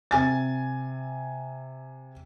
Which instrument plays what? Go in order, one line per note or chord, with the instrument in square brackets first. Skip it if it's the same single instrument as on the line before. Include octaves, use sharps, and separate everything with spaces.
[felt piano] C3 G#5 A6